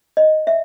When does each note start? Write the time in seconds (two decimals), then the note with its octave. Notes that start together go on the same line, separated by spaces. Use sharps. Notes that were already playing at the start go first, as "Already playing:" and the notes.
0.17 D#5
0.47 E5